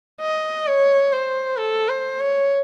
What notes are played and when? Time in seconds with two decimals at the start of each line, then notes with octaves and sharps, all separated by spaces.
0.21 D#5
0.67 C#5
1.12 C5
1.58 A4
1.89 C5
2.20 C#5